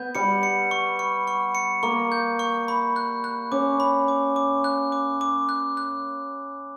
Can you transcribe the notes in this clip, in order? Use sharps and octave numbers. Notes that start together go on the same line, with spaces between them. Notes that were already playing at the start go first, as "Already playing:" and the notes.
Already playing: B3 G6
G3 C#7
C#7
C#6
C#6
C#6
C#7
A#3 C#6
G6
C#6
B5
F#6
F#6
C#4 D6
B5
D6
D6
F#6
D6
D6
F#6
F#6